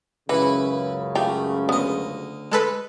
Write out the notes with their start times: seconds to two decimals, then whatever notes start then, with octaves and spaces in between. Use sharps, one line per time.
0.29 C#2 F#2 C#3 E3 E4 B4
1.15 A3 F4 G4
1.69 D2 B3 D#5
2.52 G#3 A4 B4